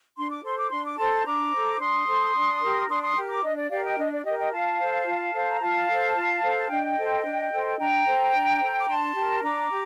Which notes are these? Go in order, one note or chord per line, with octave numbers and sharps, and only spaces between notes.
D4 C6
D6
A4 C5 C6
D6
D4 C6
D6
A4 C5 A5 C6
D4 A#5 D6
A4 C5
D4 C6 D#6
A4 C5
D4
G4 A#4
D4 C6 D#6
C6 D#6
G4 A#4
A#5 D6
D4 D#5
D5
G4 A#4 D5 F5
D#5 G5
D4 D#5
D5
G4 A#4 D#5
D#5 G5
F4 F5 A5
A4 C5
F4
A4 C5
A#5
F4 F5 A5
A4 C5
F4
A4 C5
A5
D4 D#5 G5
A4 C5
D4
A4 C5
D4 G5 A#5
A4 C5
D4
A4 C5
D6
D4 A5 C6
G4 A#4
D4 A#5 D6
G4